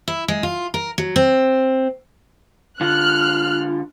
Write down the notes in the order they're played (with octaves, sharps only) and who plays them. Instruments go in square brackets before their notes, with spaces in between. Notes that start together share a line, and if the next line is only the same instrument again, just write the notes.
[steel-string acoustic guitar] E4
G#3
F4
A#4
F#3
C4
[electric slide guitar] D3 F4 [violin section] F6 F#6